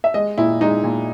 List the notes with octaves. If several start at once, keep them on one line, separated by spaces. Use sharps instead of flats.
E5
G#3 D#5
A#2 E4
G#3 D#4
A#2